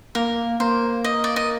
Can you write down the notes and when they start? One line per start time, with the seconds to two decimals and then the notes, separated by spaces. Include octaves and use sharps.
0.15 A#3 A#4
0.60 A#3 C5
1.04 D#5
1.24 D5
1.36 D#5